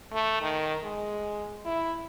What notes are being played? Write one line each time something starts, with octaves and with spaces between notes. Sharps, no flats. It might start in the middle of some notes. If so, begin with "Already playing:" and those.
A3
D#3
G#3
E4